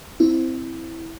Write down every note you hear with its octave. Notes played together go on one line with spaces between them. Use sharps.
C4 E4